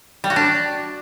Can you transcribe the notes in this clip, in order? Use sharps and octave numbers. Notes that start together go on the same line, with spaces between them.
G3
F#4
D4